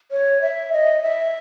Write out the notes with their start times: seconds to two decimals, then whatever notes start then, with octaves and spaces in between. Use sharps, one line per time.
0.11 C#5
0.42 E5
0.73 D#5
1.03 E5